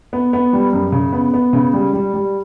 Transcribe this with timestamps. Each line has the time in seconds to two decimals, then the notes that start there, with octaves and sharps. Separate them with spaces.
0.13 B3
0.33 B3
0.53 G3
0.73 F#2
0.92 C#3
1.13 B3
1.34 B3
1.53 C#3
1.73 G3
1.93 G3
2.14 G3